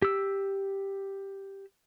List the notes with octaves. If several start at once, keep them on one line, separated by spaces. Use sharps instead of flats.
G4 E6